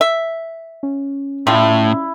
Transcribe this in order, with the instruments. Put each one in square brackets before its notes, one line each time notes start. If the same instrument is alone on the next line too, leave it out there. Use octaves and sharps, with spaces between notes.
[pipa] E5
[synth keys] C#4
[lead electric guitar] A2 [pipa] G3 F4 [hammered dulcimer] E4